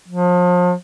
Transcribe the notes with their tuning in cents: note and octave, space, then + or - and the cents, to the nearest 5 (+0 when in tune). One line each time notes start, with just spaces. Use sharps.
F3 +35